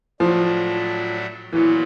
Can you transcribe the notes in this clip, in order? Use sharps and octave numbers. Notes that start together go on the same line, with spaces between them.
A2 F3 F#3 A3 D4
A#2 E3 F#3 B3